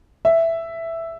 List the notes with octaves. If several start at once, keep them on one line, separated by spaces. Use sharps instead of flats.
E5